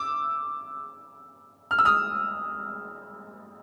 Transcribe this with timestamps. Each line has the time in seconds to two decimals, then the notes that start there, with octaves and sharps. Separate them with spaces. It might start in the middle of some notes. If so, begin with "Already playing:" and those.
Already playing: D6 E6
1.71 F6
1.79 E6
1.85 D#6 F6